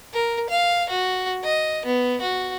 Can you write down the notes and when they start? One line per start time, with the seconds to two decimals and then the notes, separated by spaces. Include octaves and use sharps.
0.13 A#4
0.50 F5
0.90 F#4
1.44 D#5
1.86 B3
2.21 F#4